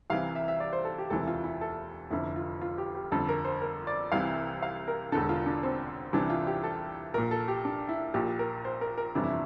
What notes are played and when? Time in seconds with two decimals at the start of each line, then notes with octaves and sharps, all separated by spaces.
0.10 C2 C3 E3 F5
0.35 E5
0.48 E5
0.60 D5
0.73 C5
0.85 A4
0.98 G4
1.10 E1 D2 C3 E3 A4
1.28 F4
1.44 E4
1.61 A4
2.11 F1 F2 D3 E4
2.36 F4
2.61 F4
2.78 G4
2.95 G4
3.11 G1 F2 D3 A4
3.29 A#4
3.45 C5
3.62 A#4
3.87 D5
4.12 C2 C3 E3 F5
4.62 F5
4.88 A#4
5.12 E1 E2 D3 A4
5.29 F4
5.46 D4
5.63 C4
6.13 C2 C3 E3 D4
6.30 F4
6.47 G4
6.63 A4
7.14 A#1 A#2 A#4
7.31 A4
7.48 G4
7.65 D4
7.89 E4
8.14 A#1 A#2 G4
8.39 A#4
8.65 C5
8.81 A#4
8.98 A#4
9.15 G1 F2 C3 E3 D4
9.24 E4